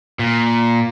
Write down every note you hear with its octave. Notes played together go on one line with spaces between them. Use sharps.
A#2